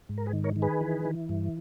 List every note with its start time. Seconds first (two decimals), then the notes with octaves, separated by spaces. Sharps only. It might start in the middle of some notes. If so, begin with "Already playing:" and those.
0.09 G#2
0.18 A#4
0.26 G#4 B4
0.33 D#3
0.44 A#4 C#5
0.56 D#3
0.62 G#4 B4
0.81 E3
1.05 E3
1.29 G2